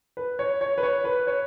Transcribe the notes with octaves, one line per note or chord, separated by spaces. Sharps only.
B4
C#5
C#5
B4
C#5
B4
C#5